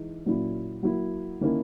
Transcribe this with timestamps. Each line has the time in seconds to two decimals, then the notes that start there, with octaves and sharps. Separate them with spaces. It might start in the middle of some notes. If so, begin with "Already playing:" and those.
Already playing: E3 G#3 D#4
0.26 A#2 F#3 C#4 E4
0.83 F#3 A#3 E4
1.41 D#3 A#3 C#4 E4